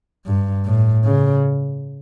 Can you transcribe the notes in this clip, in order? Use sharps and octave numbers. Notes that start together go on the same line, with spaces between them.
G2
A2
C#3